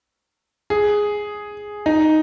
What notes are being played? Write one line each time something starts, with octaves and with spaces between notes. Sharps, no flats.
G#4
D#4